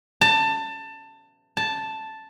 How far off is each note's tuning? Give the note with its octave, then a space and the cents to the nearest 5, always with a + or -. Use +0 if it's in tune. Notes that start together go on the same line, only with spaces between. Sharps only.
A5 +20
A5 +0